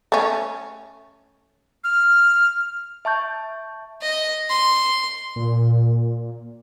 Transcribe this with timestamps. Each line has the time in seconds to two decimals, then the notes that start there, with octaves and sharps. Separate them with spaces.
0.12 A3 C#4
1.84 F6
3.05 E5 A5 C#6 G6
4.02 D#5
4.49 C6
5.36 A#2